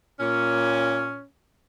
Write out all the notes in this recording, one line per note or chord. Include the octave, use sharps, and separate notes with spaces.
A#2 C#4